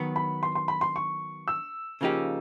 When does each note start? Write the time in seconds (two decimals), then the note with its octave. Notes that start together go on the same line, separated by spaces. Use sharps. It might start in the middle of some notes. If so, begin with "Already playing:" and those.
Already playing: D#3 F#3 B3
0.16 B5
0.43 C6
0.55 C6
0.68 B5
0.81 C6
0.96 C#6
1.48 E6
2.01 C#3 F3 A#3 D#4 G4